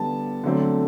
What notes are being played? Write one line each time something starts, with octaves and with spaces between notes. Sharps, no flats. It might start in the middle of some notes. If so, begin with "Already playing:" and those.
Already playing: D3 G3 B3 A5
D3 F#3 A3 C4